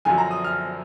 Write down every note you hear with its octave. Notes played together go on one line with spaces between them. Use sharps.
F#2 D3 F3 G#5
A#5
D#6
F6